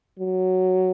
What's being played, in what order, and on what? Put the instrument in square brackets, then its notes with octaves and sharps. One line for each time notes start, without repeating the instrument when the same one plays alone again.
[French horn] F#3